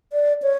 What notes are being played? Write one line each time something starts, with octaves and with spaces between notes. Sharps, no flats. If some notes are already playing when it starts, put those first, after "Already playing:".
D5
C#5